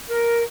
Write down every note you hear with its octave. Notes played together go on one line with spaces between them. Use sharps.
A#4